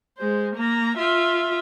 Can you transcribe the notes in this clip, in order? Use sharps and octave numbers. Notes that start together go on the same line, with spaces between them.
G#3 C5
A#3 A#5
F4 E5